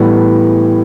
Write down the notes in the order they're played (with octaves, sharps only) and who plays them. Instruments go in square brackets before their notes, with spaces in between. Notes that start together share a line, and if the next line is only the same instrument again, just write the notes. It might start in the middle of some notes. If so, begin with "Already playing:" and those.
Already playing: [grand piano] A2 E3 G3 B3